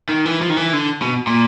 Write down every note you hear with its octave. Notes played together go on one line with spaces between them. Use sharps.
D#3
E3
F3
D#3
E3
D3
B2
A#2